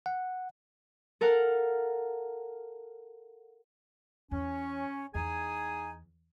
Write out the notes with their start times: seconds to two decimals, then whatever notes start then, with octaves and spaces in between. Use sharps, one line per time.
0.06 F#5
1.21 A4 A#4 F5 F#5
4.31 E2 C#4
5.15 E2 D#4 G#4 G#5